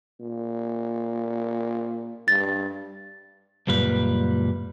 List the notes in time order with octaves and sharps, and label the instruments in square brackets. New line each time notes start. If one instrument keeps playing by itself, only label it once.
[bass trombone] A#2
[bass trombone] G2 [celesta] A6
[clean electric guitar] C#2 F#2 A#2 G3 B4